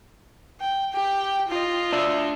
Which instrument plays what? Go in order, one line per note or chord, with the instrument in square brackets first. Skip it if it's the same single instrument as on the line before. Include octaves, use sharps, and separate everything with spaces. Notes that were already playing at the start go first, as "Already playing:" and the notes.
[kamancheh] G5
G4 G5
F4 D#5
[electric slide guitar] D4 D5 E5